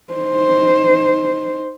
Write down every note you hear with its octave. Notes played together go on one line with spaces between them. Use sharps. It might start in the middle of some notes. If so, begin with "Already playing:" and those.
D#4 C5